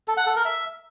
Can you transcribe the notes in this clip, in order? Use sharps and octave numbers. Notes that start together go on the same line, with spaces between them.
A4
F#5
A4
A#4
E5